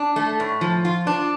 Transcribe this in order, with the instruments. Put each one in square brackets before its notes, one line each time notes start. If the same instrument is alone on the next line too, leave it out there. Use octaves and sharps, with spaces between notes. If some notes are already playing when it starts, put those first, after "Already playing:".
Already playing: [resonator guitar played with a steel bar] D4
A3
A2
F3
F4
D4